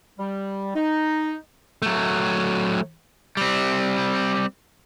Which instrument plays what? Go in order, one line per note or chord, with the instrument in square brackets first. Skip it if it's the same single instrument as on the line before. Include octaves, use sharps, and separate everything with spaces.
[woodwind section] G3
D#4
[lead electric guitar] F#3 A3
[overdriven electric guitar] G3 C4